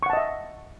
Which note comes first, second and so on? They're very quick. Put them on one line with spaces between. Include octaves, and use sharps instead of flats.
C#6 F#5 A5 D#5 E5